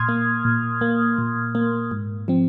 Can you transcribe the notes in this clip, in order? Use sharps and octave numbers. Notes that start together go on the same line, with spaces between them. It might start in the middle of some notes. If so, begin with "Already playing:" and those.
Already playing: A#2 C6 D#6 F6 G#6
A#3
A#2
A#3
A#2
A#3
G#2
F3 C4